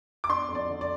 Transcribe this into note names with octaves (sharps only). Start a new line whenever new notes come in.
D6
D4 C6
F2
D5
D3
D5